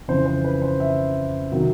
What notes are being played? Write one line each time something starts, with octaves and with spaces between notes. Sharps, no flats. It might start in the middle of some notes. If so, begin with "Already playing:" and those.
F2 C#3 E3 C5
C5
B4
C5
E5
C3 D#3 F#3